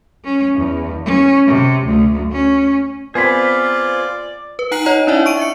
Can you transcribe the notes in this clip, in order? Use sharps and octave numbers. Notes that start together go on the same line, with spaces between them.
C#4
E2
C#4
C3
D2
C#4
B3 C4 F4 G#4 C5 D5 B5
B4
D#4 F#5 A#5 F#6 C7 F#7
D#4 C#5 D#5 A#5
C#4 D4 E4 D5 E5
C#6 D7 D#7
E5 C#7